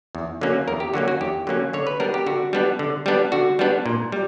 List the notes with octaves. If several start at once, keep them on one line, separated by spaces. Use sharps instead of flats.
E2
D3 F#3 A#3 C#4
E2 A#4
G4
D3 F#3 A#3 C#4 F#4
F#4
E2 G4
D3 F#3 A#3 C#4
D3 C#5
B4
G3 B3 D4 A#4
G4
D3 F#4
G3 B3 D4
D3
G3 B3 D4
D3 F#4
G3 B3 D4
A#2
G3